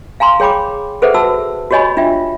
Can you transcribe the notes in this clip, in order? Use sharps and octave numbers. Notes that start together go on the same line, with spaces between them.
F5 G#5 A#5 C6
G#4 C#5 G5 B5 D6
G#4 A4 B4 C5 E5 F#5
F#4 A5 E6
F#4 G4 C#5 D#5 G#5 B5
D4 F4 E5 G5